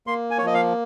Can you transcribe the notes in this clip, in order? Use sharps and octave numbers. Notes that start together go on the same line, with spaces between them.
A#3 C6
G#5
C#5
F3 D#5
F5